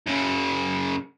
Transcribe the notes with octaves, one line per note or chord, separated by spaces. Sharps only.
F#2 C#3